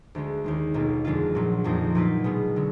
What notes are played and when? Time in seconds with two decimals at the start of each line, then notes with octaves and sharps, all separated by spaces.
0.15 D2 D3 G#3
0.44 D#2 D#3 G#3
0.74 B1 B2 A#3 F4
1.05 F2 D3 G#3 D4 F4
1.35 A#1 A#2 F#3
1.64 F1 F2 F3 A#3 D#4
1.95 A#2 F#3 A#3 F4 B4
2.24 B2 G#3 B3
2.56 D3 F#3